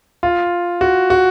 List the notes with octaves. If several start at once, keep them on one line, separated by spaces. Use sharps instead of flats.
F4
F#4
F#4